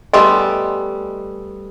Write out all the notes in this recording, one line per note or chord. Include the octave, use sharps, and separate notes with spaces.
G3 A3 B3 D#5 G#5 C6